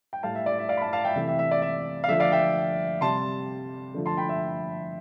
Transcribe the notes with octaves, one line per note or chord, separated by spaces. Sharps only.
G5
A2 G3 F5 A5
E5
D5
E5
D5 F5
B5
F5 A5
F5 A5
E5 G5
C3 E3 A3 E5
E5
E5
D5
E5
F5
D3 F3 A3 E5
D5 F5
E5 G5
C3 G3 A5 C6
D3 F3 A3
A5 C6
G5 B5
E5